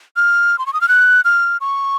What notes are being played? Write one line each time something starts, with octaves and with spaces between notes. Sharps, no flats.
F6
C6
C#6
D#6
F6
F#6
F6
C#6